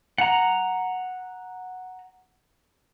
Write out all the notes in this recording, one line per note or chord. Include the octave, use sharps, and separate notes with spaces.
F#5 A#5